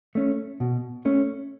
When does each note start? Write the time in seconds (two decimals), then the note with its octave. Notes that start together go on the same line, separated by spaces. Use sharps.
0.15 A3 C#4
0.60 B2
1.05 A3 C#4